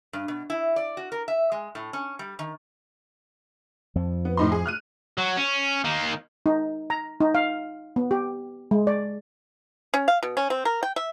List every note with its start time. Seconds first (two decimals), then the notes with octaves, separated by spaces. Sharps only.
0.13 G2
0.28 B2
0.50 E4
0.76 D5
0.97 F#4
1.12 A#4
1.28 E5
1.52 G#3
1.75 A2
1.93 C#4
2.19 G3
2.39 D#3
3.96 F2 F3
4.25 B3
4.37 A2 D#4 C6
4.52 G#4
4.66 F6 F#6 D#7
5.18 F#3
5.37 C#4
5.84 D#3 A#3
6.46 D#4
6.90 A#5
7.20 D#4
7.35 F5
7.96 B3
8.11 G4
8.71 G#3
8.87 D5
9.94 C#4
10.08 F5
10.23 B2
10.37 C#4
10.50 C4
10.65 A#4
10.83 G5
10.96 E5